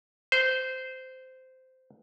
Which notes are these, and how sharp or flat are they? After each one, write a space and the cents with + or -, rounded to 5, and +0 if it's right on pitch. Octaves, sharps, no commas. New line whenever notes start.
C5 -15